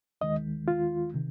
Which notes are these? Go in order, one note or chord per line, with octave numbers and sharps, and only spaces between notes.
D#2 D#3 G#3 D#5
F4
C3 D#3